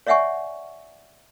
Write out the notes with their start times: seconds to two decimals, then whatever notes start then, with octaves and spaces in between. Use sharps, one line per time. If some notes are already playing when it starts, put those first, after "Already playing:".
0.07 C#5 D5 E5 F#5 G#5 C#6